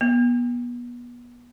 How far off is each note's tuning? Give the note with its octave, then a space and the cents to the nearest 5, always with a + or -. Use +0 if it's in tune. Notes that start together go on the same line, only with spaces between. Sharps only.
B3 -30